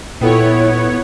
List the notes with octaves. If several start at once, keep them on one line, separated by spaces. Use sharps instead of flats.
A#2 B3 E4 F4 A4 C#5 G5